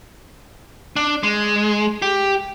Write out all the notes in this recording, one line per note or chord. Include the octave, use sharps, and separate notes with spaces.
D4
G#3
G4